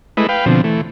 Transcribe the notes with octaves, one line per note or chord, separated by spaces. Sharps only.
G#3 A3 E4 B4 D#5
B4 F5 G5
B2 D3 F3 C4
E3 A3